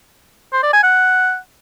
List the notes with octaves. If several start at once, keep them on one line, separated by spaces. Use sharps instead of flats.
C5
D5
G#5
F#5